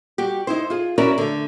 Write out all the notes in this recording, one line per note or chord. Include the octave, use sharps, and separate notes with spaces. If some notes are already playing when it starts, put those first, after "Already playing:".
G3 F#4 G4
D#4 E4 C5
F4 G#4
C#4 E4 F#4 A#4 C#5 D5
D3 A3